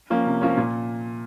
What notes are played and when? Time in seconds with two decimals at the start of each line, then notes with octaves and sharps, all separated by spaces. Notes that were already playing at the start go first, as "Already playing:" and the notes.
0.10 F3 A#3 C#4
0.26 C3
0.41 F3 A#3 C#4
0.57 A#2